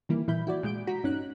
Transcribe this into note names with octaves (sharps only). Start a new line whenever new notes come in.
D#3 E3 G3 A#3 E4
A#2 E3 E4 B5 G6
E4 F#4 D5
A#2 G#3 G6 D7
F#4 A#5 B6
G2 C#4 D#4 F#6